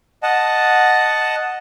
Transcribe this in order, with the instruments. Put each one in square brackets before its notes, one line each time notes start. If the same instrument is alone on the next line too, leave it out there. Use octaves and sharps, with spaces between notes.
[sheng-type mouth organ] D#5 F#5 A5